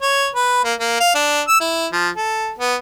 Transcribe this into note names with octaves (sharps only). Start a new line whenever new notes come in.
C#5
B4
A#3
A#3
F5
D4
E6
E4
F3
A4
B3